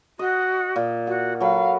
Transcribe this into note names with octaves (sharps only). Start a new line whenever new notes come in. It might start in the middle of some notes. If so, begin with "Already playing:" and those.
F#4 D#5
A#2
F#4 F#5
F#3 A4 F5 B5